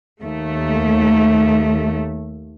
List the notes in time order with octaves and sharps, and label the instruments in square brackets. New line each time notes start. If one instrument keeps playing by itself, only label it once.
[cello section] D#2 A3